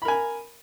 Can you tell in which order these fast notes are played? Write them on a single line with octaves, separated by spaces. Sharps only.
B5 A#4 G#5